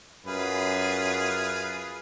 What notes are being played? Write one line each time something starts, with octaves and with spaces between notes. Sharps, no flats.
F#2 F4 G#4 B4